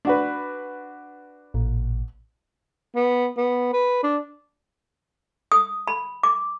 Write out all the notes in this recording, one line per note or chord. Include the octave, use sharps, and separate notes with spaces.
D4 F#4 B4
A1 A#2
B3
B3
B4
D4
D#6
B5
D6